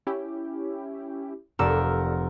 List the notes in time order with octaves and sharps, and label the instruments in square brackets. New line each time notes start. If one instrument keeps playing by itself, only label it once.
[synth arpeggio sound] C#4 E4 G4
[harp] F1 E6 [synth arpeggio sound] G4 A4 D5 [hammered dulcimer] A#4 F#5